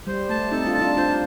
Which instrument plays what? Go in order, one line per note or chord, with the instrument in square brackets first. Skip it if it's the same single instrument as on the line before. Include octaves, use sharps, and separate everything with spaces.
[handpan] G3 [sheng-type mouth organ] C5
[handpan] A3 [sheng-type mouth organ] A5
[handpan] C4 D#4 [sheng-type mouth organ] A4
[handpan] D4 F4
[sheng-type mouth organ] A5
[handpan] D4 F4
[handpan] D4 F4 [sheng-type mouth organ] C5